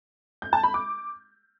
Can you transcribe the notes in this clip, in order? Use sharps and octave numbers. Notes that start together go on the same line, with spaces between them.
G6
A5
B5
D6